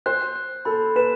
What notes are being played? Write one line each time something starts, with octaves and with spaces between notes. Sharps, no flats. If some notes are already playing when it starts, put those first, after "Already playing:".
C5 F#6
F#6
A4 B5
B4 E7